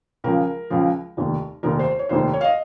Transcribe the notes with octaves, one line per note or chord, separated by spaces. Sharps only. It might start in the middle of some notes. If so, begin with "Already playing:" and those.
C#2 C#3 F3 A#4
C#2 C#3 F3
F1 D#2 D#3
F1 D#2 D#3 A#4
C5
C#5
F1 D#2 D#3 C5
C#5
F5
D#5